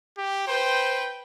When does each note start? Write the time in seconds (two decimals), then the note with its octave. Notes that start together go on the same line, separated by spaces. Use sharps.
0.18 G4
0.48 B4 C5 G5